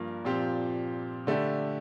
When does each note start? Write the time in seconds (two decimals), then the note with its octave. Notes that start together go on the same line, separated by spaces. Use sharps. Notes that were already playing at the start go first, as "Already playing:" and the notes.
Already playing: G2 F3 A#3
0.25 A#2 F3 C4 G4
1.27 D3 A3 D4 G4